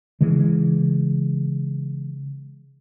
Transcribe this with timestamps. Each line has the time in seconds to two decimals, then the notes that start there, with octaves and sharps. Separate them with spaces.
0.21 C#3 E3 G#3